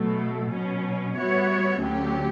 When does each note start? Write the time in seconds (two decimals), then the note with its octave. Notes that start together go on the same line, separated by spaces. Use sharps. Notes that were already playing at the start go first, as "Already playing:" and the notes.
Already playing: B2 F#3 A3
0.50 B2 F#3 C#4
1.15 G3 B3 F#4 C#5 E5
1.80 D2 D3 F#3 C#4 G4